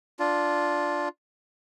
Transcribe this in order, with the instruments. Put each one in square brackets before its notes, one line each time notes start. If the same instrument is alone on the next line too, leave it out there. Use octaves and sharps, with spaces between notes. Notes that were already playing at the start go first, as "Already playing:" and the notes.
[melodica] D4 F4